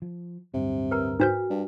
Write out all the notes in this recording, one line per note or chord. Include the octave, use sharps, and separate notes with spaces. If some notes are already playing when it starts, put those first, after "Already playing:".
F3
D1 G2 C3
A#4 B4 A#5
G#2 D4 F#4 B4 C5 G6
G2